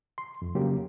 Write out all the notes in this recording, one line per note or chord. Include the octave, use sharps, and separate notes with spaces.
C6
F2
C#3 F#3 A#3 G4